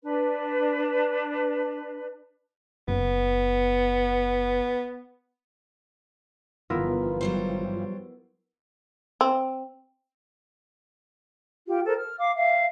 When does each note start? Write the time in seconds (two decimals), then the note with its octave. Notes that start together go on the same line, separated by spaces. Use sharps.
0.03 D4 B4
2.88 F#1 B3
6.70 G1 G2 E3 F3 B3 E4 F4 A#4
7.21 F#3 G3 C5
9.21 C4
11.67 F4 G4
11.86 A4 A#4 C5
11.97 F6
12.19 F5 D6
12.37 E5 F5